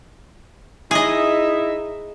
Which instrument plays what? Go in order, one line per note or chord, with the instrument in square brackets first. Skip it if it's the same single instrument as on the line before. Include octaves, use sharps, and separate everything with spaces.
[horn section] D#4 E4 E5 [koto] G#4 D#5